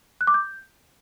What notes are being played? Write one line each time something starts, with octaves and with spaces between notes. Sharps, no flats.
F#6
D6
G6